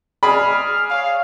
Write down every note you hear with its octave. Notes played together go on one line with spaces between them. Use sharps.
G#4 D5 B5 F6
C#5 F5